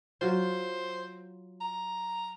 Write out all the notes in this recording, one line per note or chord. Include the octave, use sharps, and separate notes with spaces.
F#3 F4 C5
A#5